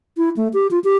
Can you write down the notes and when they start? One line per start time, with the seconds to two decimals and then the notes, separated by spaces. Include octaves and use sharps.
0.17 E4
0.37 A3
0.54 G4
0.71 F4
0.84 G4